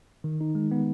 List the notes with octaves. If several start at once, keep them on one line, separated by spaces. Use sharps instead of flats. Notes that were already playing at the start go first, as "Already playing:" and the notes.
D#3
D#4
G#3
B3